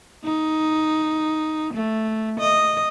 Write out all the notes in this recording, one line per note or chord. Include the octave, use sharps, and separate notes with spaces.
D#4
A3
D#5